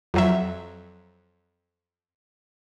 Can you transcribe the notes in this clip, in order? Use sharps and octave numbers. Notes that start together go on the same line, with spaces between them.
F2 F#3 E5